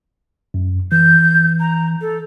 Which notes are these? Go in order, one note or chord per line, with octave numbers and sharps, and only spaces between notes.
F#2
E3 G6
A#5
A4